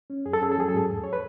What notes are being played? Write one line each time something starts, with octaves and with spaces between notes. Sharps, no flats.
C#4
F#2 G#4
A4
C#4 G#4
A4
F#3 G#4
A4
G#2 G#4
E2
C#5
B4